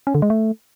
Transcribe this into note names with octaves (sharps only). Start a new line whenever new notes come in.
C#4
D3
G#3
A3